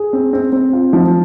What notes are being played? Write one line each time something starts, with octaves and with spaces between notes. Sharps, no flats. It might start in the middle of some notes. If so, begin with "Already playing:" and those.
Already playing: G#4
C4
C4
C4
F4
F3